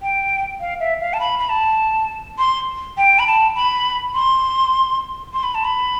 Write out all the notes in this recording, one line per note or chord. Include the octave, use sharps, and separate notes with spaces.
G5
F5
E5
F5
A5
B5
B5
A5
C6
G5
B5
A5
B5
C6
C6
B5
A5
B5